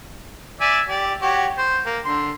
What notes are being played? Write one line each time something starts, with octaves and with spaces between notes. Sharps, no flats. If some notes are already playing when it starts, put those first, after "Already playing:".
D5 E5 G#5
G4 D5
F#4 G4 C#5
C5
A#3
D3 C6